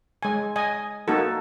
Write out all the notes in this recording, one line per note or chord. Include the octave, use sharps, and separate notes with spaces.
G#3 G#5
D#5 G#5
A#3 D#4 F#4 A4